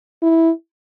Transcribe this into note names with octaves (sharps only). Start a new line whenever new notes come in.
E4